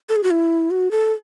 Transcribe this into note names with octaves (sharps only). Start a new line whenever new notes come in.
A4
G#4
F#4
E4
F#4
A4